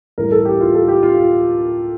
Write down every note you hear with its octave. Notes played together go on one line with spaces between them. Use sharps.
A2 E3 G3 A#4
A4
G4
F4
A4
G4
F4